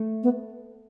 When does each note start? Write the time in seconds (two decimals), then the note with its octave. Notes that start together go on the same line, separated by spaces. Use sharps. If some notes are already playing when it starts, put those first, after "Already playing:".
Already playing: A3
0.23 B3